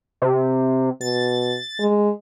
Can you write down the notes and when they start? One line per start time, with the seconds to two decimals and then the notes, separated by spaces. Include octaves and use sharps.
0.22 C3
1.01 B2 A6
1.79 G#3